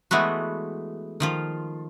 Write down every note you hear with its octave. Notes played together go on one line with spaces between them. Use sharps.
E3 G#3 A3 B3 F#4
D#3 F3 F4